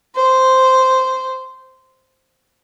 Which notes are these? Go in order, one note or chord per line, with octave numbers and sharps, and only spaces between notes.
C5